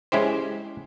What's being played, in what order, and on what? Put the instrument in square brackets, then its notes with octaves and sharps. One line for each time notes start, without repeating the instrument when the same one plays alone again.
[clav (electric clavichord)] G#3 C#4 E4 G4 C5